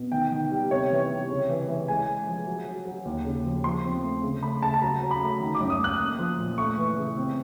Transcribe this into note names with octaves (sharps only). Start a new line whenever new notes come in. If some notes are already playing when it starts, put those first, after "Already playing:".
Already playing: B2
D#3 G5
D#3
G3
C3 C#5
E3
C3
C#3
E3
E3
G#3 G#5
G#3
F3
F#3
F#3
F#3
D#2
C#3
F3
F3 C6
C4
A3
C#3
A3 B5
C#3 A5
A5
F#3 A#5
F#3
B5
A3
D#3
D6
F#2
D#6
F#2 F#6
A#3
F3
A#2
A3 C#6
E3
C#3
C4